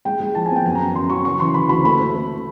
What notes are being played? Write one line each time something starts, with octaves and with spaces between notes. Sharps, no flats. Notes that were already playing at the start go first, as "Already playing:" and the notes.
G#3 G5
G#3
F3 A5
G#5
B3 G5
F#2 G#5
A#5
F#2
F#2 C6
F#3 C#6
C#3 C#6
E3 C6
E3 B5
D2 B5
A3 B5
A3
A3